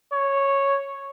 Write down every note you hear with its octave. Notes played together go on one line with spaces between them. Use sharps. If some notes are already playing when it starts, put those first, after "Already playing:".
C#5